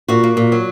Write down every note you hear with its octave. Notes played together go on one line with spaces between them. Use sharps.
A#2 F#4
A#3
A#2
F#3